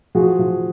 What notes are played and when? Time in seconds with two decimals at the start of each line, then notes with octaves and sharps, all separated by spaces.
0.15 F3 F#4 G#4
0.39 F3